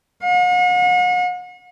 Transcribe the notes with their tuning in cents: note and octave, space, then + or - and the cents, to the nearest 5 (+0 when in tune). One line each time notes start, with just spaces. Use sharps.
F#5 -45